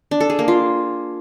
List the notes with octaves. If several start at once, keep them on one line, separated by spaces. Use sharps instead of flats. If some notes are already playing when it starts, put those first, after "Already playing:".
D4
A4
G#4
A#3
F4